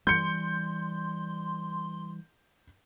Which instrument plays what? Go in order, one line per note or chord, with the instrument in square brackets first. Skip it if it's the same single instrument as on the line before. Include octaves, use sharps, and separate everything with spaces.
[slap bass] E3 G3 [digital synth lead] C6 [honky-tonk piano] G6 C#7